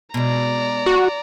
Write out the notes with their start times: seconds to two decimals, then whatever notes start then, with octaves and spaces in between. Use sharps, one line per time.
0.14 B2 G#3 D5 A#5
0.86 F#4